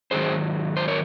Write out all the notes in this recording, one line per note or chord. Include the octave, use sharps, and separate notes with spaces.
G#2 D#3 F#3 G#4 C5
C5
A#4 C#5